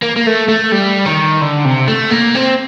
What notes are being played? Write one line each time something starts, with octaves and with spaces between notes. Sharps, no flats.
A#3
A#3
A3
A3
G3
D#3
D3
C3
A3
A#3
C4